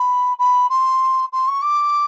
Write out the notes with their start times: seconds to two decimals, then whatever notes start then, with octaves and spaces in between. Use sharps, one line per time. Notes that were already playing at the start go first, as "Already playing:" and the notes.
Already playing: B5
0.39 B5
0.70 C6
1.33 C6
1.48 C#6
1.62 D6